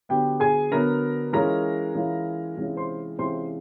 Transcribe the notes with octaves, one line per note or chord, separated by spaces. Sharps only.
D3 F#3 B3 G4 G5
G#4 G#5
D3 F#3 B3 A#4 A#5
E3 G#3 C#4 F4 A#4 A#5
E3 G#3 C#4 F4
C3 E3 G#3 C#4 F4
C5 C6
C3 E3 G#3 C#4 F4 C5 C6